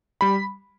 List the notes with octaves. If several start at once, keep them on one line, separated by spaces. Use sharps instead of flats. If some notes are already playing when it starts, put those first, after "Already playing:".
G3 B5